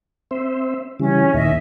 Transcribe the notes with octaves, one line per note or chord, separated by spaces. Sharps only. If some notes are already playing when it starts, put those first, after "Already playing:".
C4 C5 E5
C#3 E3 G3 C#4
D#2 A#2 D#3 D#5 E5